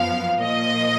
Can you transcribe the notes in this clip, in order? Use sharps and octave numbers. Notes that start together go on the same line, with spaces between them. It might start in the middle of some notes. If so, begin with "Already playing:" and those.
Already playing: F#2 F3 B3 F5
A#2 F3 A#3 D#5